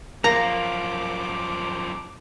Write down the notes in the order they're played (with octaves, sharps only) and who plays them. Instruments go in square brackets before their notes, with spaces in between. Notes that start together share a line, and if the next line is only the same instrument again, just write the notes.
[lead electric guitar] F#2 F3 [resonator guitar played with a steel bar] A#3 [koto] A#5 [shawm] D6